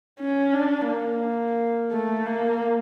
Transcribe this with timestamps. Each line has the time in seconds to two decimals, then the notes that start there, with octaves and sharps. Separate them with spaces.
0.20 C#4
0.54 D4
0.88 A#3
1.92 A3
2.26 A#3